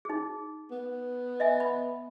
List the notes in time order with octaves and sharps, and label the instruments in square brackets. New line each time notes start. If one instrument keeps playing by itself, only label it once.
[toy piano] D#4 G#4
[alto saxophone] B3
[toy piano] D#5 E5 G#5
B5